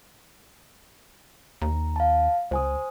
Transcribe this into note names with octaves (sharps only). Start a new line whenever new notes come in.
D#2 A#5
F5 A5
C#2 C5 G#5 D#6